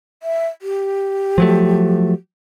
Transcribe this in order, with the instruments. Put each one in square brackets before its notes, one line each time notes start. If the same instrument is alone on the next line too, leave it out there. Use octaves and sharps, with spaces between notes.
[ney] E5
G4
[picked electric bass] F3 F#3 A3